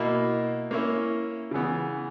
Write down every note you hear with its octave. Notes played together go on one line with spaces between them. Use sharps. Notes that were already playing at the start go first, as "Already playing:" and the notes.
Already playing: B2 A#3 E4
A#3 C#4 E4
C#3 E3 B3